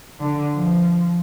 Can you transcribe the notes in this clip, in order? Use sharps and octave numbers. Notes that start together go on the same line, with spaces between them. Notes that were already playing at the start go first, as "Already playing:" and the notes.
D3
F3